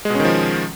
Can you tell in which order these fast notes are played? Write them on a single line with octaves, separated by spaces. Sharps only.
G#3 B2 C#4 D#3 F3